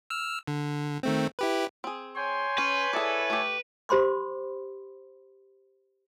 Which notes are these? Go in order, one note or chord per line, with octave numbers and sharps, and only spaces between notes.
E6 F6
D3
D#3 A3 C4
E4 G4 B4
C4 G#4
C#5 G5 G#5 C6
C#4 B4
E4 G#4 A4 D5
A3 G4
G4 C5 B5 C6 D6